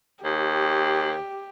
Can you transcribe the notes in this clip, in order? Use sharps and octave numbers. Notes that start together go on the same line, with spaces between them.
D#2 G4